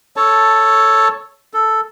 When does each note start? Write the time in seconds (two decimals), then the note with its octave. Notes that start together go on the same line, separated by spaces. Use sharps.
0.16 A4 C#5 A5
1.53 A4